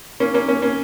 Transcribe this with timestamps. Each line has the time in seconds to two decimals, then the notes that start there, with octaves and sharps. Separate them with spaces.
0.20 A#3 C#4
0.34 A#3 C#4
0.48 A#3 C#4
0.62 A#3 C#4